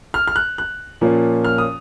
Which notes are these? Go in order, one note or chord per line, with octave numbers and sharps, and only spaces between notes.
F6
F6
F#6
F#6
A#2 F3 A#3 C#4
F6
D#6